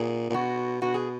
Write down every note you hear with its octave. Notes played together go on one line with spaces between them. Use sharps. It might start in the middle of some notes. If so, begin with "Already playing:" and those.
Already playing: A#2 G#4
A#2
B2 F#4
B2 F#4
G#4